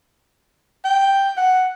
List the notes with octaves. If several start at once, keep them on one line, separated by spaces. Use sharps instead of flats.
G5
F#5